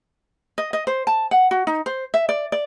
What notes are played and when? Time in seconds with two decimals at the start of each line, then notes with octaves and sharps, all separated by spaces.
0.58 D#5
0.73 D#5
0.87 C5
1.07 A5
1.31 F#5
1.51 F#4
1.67 D#4
1.86 C5
2.14 E5
2.29 D5
2.52 D5